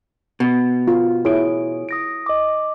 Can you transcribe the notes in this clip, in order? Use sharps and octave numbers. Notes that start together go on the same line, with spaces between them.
B2
F4
E4 G#4 C#5 D7
D#6 A#6 D7
D#5 D6